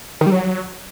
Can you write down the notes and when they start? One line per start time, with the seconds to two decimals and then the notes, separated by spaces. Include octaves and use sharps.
0.21 D#3
0.26 G3
0.32 F#3